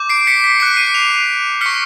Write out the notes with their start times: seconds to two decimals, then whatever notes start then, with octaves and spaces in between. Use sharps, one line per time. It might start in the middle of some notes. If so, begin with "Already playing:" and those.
Already playing: D6 G6
0.09 C7 D7
0.27 B6 C#7
0.44 B6 C#7
0.60 D6 F#6 C7 D7
0.77 C#7 D#7
0.94 D#7 F7
1.61 C#6 F6 B6 C#7